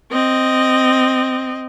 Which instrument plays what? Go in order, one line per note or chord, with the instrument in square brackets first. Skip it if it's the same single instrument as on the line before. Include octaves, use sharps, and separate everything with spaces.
[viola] C4 D#5